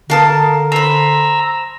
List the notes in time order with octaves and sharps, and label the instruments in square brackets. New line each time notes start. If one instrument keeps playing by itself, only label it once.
[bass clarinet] D3 [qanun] A#4 [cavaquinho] F5 A5 D#6
[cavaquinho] C5 B5 [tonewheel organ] A#5 E6